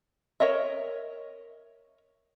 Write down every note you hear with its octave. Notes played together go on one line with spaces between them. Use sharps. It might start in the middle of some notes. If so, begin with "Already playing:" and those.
A#4 C#5 D#5 E5